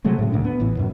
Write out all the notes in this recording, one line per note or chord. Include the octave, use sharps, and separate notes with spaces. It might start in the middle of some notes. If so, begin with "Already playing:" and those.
C3 F#3 G#3 A3
A2 C#3
D2 A#2 D4
B3
A1 A2 E3
F#2 B2